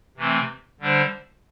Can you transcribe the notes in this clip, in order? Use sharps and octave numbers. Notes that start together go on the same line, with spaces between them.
C3 E3 A3 C4
D3 G3 D4 C5